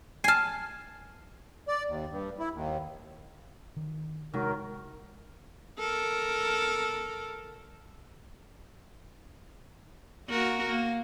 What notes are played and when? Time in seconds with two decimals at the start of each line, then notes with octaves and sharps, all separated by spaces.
0.24 G#5 A5 F6 C7
1.67 D5
1.87 D#2
2.10 G2
2.39 E4
2.53 D#2
3.77 D#3
4.34 C3 D#3 F#3 G#3 A#4
5.79 A4 A#4
10.29 A#3 F#4 A#4
10.68 A#3